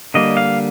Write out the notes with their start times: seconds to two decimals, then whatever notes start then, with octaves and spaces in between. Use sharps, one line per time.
0.14 D3 G3 A#3 D#5
0.37 F5